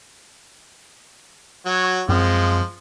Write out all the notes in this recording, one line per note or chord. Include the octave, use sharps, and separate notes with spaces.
F#3 F#4 C#5
F#2 F3 G#3 C4 F4